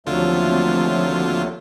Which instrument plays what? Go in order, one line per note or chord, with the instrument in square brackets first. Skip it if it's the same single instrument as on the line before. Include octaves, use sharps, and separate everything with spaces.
[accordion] D#2 F#3 A3 [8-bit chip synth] D3 F4 [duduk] F3 [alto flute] C4